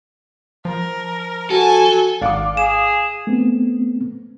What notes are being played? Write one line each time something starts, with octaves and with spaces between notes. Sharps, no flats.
F3 A#4
F#4 A4 G#5
G#1 D5 F5 F#5 D6
G#4 E7
A3 B3 C4